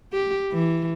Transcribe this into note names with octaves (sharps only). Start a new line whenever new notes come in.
G4
E3